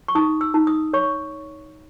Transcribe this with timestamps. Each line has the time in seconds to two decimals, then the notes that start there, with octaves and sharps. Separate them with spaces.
0.08 C#6
0.15 D#4 D#6
0.41 E6
0.54 D#4
0.67 D#6
0.93 C#5 C#6